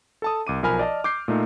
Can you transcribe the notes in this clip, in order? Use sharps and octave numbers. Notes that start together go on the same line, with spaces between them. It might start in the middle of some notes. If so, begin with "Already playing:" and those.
A4 A5 D#6
C2 D6 D#7
B1 F3 A#4 G#5 B5 F6
D5 D#5 A5
D6 G6 C7
A#2 A3 D#4